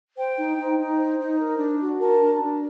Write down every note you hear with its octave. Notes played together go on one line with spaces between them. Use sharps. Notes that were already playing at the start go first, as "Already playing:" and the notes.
C5 G5
D#4
D#4
D#4
C5
D#4
A#4
D4
F#4
A#4 A5
D4
D4